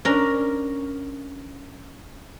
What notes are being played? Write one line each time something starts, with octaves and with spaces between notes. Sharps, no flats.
C#4 D4 A#4